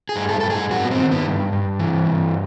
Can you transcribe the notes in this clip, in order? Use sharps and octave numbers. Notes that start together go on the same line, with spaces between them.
G#4
G2
A4
G2 A4
G#4
G2 F#4
B3
C4
D#3
B3
G2
G2
E3
G2